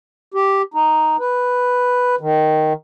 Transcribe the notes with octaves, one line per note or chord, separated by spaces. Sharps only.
G4
D#4
B4
D#3